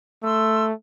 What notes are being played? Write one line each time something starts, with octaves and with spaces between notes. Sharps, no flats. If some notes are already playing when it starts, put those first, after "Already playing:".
A3 C6 E6